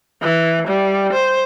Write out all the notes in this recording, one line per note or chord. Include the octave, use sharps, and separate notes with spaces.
E3
G3
C5